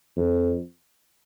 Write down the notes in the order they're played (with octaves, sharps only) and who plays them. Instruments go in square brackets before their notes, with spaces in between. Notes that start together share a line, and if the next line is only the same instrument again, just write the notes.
[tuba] F2